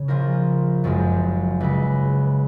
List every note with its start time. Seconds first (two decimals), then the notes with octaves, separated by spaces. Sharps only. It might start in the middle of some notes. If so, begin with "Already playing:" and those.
Already playing: C#3 C#5
0.08 A#1 A#2 F3 A#4
0.84 F#1 F#2 F3 G#3
1.60 C#2 C#3 G#3 B4